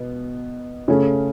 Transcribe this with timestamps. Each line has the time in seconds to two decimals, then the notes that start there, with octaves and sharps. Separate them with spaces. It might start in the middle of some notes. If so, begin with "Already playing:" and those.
Already playing: B2 B3
0.88 C#3 A3 C#4